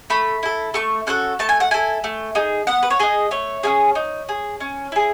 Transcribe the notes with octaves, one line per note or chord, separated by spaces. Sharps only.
A3 B5
E4 A4
A3 C#6
C#4 F#4 A4 F#6
A3 A5
G#5
F#5
E4 A4 G#5
A3
D#4 G#4
B3 F#5
B4
C#5
D#4 G#4 D#5
A3 C#5
C#4 E4 G#4
D#4
G#4
C#4
E4 G#4